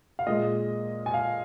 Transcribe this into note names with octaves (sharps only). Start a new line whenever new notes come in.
F5
A#2 G#3 D#5
G#5
F5